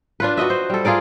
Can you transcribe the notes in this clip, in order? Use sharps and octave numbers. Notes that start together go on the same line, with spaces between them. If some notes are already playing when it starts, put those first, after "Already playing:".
D4 F4 B4
F#4 B4 D#5 E5
C5
G3 A4
F4 G#4 A#4 D5